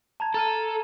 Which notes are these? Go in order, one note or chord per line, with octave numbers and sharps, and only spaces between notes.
A5 A#5 G#6
A4 A#5 F6 D#7